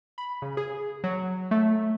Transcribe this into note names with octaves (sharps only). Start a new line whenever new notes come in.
B5
C#3
G#4
F#3
A3